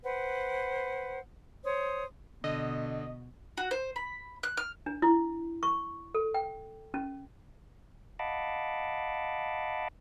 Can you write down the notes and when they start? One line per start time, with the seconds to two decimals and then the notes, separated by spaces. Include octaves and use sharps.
0.04 B4 C5 F#5
1.65 C5 C#5 D#6
2.44 B2 D3 D#5
3.57 F#4
3.71 C5
3.96 B5
4.43 F#6
4.57 F6
4.86 D4
5.02 E4
5.63 C#6
6.15 A4
6.34 G5
6.94 C#4
8.19 D#5 F5 F#5 A5 B5 D6